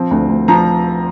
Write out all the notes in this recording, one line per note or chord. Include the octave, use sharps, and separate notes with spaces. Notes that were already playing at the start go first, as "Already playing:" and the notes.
Already playing: F3 C4
D2
D2
F3 A#5